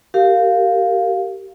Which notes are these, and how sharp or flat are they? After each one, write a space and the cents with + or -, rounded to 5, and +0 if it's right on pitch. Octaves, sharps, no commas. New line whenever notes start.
G4 -20 A#4 -30 F5 +0